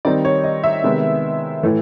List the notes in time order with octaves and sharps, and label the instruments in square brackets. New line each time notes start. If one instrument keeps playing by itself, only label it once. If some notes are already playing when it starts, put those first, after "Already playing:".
[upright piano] D#3 G3 C4 D#4 D5
C#5
D#5
E5
C3 D#3 G#3 B3
A2 E3 A3